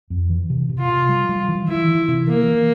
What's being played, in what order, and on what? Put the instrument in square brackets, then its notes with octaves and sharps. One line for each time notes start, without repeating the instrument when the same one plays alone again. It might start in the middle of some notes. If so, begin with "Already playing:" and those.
[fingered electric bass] F2
E3
C3
C3
[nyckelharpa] F4
[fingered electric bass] C3
G3
G3
E3
[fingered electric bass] E3 [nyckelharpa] E4
[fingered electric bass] E3
C3
[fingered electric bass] E3 [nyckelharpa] A#3
[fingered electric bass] E3